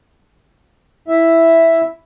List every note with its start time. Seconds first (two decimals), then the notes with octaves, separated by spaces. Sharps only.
1.08 E4 E5